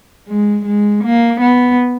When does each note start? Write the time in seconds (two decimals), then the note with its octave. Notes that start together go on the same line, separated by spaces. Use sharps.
0.27 G#3
0.64 G#3
1.02 A#3
1.39 B3